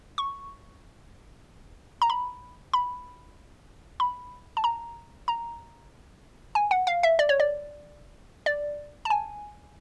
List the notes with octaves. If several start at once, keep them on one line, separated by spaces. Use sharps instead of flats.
C#6
A#5
B5
B5
B5
A5
A#5
A#5
G#5
F#5
F5
E5
D5
C#5
D5
D5
A5
G#5